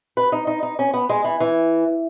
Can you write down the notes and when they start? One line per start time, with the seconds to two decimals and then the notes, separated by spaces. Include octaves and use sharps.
0.17 B4
0.32 D#4
0.47 D#4
0.63 D#4
0.79 C#4
0.94 B3
1.09 G#3
1.24 E3
1.40 E3